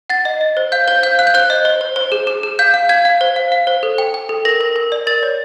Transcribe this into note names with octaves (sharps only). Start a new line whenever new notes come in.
F#5 A6
D#5
D#5
C5
F5 G6
C5 G6
F5 G6
F5 F#6
G6
C5 F#6
D#5
C5
C5
C5
G#4
G#4
G#4
F5 G6
F5
F5 G#6
F5
C5
F5
F5
C5
A4
G5
G5
A4
A#4 A#6
A#4
A#4
D5
A#4 A6
C#5